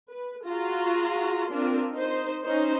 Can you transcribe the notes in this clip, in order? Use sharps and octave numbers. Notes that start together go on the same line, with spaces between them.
B4
F4 F#4 G#4 A#5 C6
C4 D4 F4 A#4
D#4 C5
C#4 D#4 C5